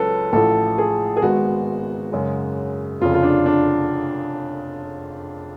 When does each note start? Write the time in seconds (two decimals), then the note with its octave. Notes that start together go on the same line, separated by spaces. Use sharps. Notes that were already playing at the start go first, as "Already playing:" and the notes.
Already playing: C#2 C#3 F#3 A4 B4
0.33 A1 A2 F3 A4
0.78 G#4
1.17 G#4
1.22 G#1 G#2 G#3 B3 F#4
2.12 F#2 C#3 G#3
3.01 F1 F2 C#3 F4
3.14 F4
3.23 D4
3.46 D4